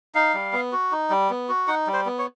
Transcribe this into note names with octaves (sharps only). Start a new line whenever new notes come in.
D#4 F5
G3
B3
F#4
D#4
G3
B3
F#4
D#4 F#5
G3
C5
B3
C#5